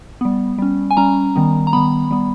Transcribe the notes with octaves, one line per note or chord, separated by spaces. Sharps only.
G3 B3
G3 C#4
G#5
G3 C#4 A#5
D#3 G3 B3
A#5
D#3 G3 B3 B5
G3 B3